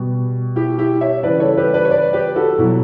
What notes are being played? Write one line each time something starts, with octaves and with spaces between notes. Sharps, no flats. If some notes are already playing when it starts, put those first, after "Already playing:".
Already playing: B2 G3
E4 G4
E4 G4
C#5 E5
C#3 E3 G3 B4 D5
A4 C#5
G4 B4
B4 D5
C#5
B4 D5
G4 B4
F#4 A4
B2 F#3 E4